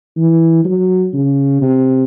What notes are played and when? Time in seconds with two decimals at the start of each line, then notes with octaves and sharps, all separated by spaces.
0.17 E3
0.65 F#3
1.14 C#3
1.61 C3